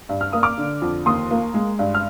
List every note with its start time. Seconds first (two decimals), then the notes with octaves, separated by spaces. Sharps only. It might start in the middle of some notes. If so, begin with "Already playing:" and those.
0.09 G2
0.21 F6
0.32 A#3 D#6
0.43 D6 F6
0.58 D3
0.82 F2
1.06 D#2 C6 D#6
1.31 A#3
1.54 G#3
1.79 G2
1.94 F6